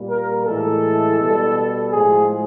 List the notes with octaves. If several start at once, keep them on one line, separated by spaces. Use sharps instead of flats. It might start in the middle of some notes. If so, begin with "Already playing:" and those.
Already playing: A#2 G3
A#4
A2 E3 G#3 A4
B2 G3
A2 F3 G#3 G#4